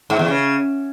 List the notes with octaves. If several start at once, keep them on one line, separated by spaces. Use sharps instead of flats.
G#2
E2
C#3